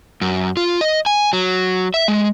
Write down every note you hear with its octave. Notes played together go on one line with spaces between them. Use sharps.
F#2
F4
D#5
G#5
F#3
E5
G#3